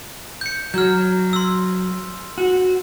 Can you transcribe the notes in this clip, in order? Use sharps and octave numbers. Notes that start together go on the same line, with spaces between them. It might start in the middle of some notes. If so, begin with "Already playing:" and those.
G6 C#7
F#3 F6 G6
C6 E6
F#4